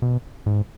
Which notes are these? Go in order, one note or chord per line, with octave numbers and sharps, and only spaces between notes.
B2
G#2